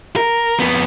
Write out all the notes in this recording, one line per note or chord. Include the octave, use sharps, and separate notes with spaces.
A#4
F2 B3